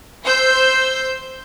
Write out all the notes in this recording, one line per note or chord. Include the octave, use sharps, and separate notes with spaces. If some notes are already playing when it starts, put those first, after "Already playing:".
C5 C6 E6 G6